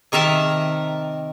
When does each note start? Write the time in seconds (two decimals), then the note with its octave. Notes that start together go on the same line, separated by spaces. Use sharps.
0.12 C3 D#3 A#4 E5 A5